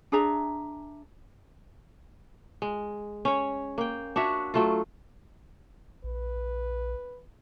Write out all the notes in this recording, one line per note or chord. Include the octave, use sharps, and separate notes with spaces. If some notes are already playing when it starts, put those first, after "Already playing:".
D4 G#4 E5 A#5
G#3
C#4 C#5
A#3 G5
D4 F#4 C#5 E5
F#3 A3 F4
A#1 B4